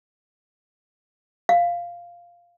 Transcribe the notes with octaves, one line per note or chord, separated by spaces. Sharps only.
F5